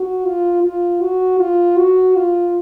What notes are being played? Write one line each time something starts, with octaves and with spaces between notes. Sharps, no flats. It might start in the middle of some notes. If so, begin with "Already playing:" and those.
Already playing: F#4
F4
F4
F#4
F4
F#4
F4